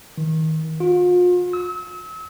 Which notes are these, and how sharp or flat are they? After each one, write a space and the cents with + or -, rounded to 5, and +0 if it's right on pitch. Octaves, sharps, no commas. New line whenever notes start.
D#3 +25
F4 +40
E6 -40